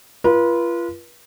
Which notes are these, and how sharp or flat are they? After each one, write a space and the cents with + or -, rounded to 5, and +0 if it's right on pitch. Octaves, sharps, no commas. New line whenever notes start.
F4 -30 B4 -40